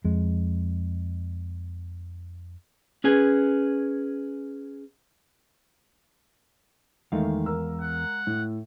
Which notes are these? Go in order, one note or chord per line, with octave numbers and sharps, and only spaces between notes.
F2 G#3
C#4 G#4 B4 G#5
E2 D#3 G#3 A3 F5
A#4 E6
F#5
A2